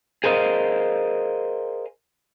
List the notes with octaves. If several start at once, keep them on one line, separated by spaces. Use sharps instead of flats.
G#4 A#4 C5 D#5 F5